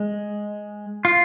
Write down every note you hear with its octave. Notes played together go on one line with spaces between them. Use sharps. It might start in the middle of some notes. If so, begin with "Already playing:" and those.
Already playing: G#3
F4